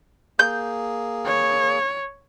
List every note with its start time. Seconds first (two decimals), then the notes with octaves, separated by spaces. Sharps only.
0.39 A#3 G#4 G6
1.26 C#5